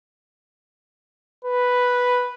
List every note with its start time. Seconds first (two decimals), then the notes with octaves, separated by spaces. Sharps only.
1.45 B4